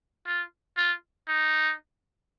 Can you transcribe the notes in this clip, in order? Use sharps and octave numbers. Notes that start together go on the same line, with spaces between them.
F4
F4
D#4